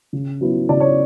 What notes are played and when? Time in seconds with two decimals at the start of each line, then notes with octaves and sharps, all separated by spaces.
0.13 C#3
0.41 F#3 B3 E4
0.69 C#3 D5
0.80 C#5